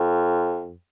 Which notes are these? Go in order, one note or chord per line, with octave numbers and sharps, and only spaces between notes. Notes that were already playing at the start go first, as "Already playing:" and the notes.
Already playing: F2